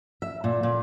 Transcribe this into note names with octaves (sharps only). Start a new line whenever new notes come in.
E5
A#2
A#2